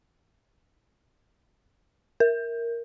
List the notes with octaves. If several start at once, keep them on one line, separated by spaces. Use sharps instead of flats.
A#4